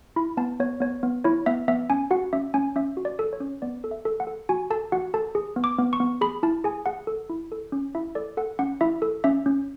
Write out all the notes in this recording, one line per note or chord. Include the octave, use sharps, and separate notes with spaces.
E4 B5
B3 A5
B3 C#5
B3 C#5
B3
E4 C#5
B3 E5
B3 E5
C#4 G#5
F#4 F#5
C#4 E5
C#4 G#5
C#4 E5
F#4
D5
A4
C#5
C#4
B3 D5
A4
E5
A4
F#5
A4
F#4 G#5
A4 A5
F#4 F#5
A4 A5
G#4
B3
D6
B3
C#6
B3
G#4 B5
E4 A5
G#4 G#5
G#4 F#5
A4
E4
A4
C#4
E4 E5
A4 D5
A4 F#5
C#4 F#5
E4 E5
A4
C#4 E5
C#4